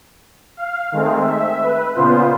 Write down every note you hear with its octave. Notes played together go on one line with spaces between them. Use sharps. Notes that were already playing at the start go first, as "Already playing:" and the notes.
F5
D#3 G#3 A3 C4
E5
B4
A#2 C#3 B3 F4 C5